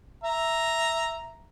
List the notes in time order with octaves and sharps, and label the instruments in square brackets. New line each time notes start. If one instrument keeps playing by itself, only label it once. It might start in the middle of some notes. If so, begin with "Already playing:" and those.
[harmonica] E5 A#5